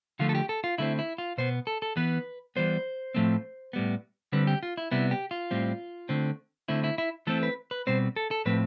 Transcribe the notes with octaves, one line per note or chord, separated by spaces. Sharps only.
D3 F3 A3 F4
A4
G4
A4
F4
D3 A3 C4 E4
E4
F4
B2 B3 C5
A4
A4
E3 B3 B4
E3 G3 B3 C5
A2 F3 A3 C4
A2 G3 B3
D3 G3 C4 B4
G4
F4
E4
C3 G3 B3 E4
G4
F4
A2 G3 C4
D3 A3 C4
D3 A3 C4 E4
E4
E4
E3 A3 C4 A4
B4
B4
B2 G3 C4 C5
A4
A4
A2 F3 A3 C4 B4